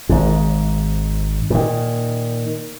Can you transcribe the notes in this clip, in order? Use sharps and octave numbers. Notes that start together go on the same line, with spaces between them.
G#1 G#2
A#2 D#3